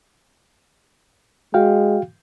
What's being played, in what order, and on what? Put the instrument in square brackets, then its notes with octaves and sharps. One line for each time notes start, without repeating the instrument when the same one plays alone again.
[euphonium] G#3 [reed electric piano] F#4 F5 G5